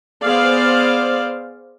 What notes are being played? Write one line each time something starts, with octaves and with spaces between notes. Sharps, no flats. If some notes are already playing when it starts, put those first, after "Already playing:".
B3 G#4 C5 D5 F5